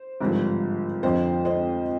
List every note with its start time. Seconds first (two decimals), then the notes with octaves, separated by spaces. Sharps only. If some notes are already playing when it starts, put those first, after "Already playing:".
Already playing: C5
0.20 G#1 G2 D3 F3
1.03 F2 D3 F3 C5 D#5
1.45 C5 D#5